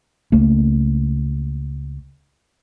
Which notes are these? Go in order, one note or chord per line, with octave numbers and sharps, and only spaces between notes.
C#2 A3 A#3